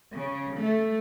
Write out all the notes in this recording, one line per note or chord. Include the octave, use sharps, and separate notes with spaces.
C#3
A3